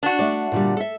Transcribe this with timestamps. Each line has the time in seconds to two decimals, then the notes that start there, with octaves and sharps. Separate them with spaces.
0.03 D4 F#4
0.19 A3 D5
0.52 A#2 D3 G3
0.77 A4 E5